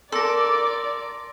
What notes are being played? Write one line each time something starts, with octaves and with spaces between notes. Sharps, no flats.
A4 A#4 D5 C6 D6 A#6